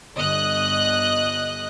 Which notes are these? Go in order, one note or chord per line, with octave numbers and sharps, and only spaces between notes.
G1 D#5 F#6